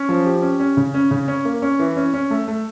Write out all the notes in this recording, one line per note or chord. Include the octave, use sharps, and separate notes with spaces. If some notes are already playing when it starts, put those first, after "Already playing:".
Already playing: C#4
F3
G4
C#4
C#4
C#3
C#4
C#3
C#4
A#3
C#4
E3
C#4
C#4
A3
A3